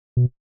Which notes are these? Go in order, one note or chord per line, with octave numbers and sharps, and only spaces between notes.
B2